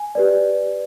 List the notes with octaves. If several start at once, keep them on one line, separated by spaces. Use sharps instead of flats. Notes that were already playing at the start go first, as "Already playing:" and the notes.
Already playing: G#5
G4 B4 D5